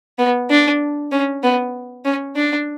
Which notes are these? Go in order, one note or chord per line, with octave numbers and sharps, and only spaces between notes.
B3
D4
C#4
B3
C#4
D4